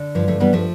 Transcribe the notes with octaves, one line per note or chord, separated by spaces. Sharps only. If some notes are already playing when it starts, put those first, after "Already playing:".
Already playing: D3
G2 F3
F3 A3
E3 G3 B3
F3 A3